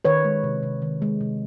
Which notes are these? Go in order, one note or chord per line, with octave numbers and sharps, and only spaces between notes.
D#3 B4 C#5
G#3
C3
C3
D#3
G#3
C3